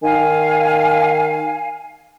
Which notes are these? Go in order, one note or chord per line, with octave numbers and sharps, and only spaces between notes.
D#3 F5 G#5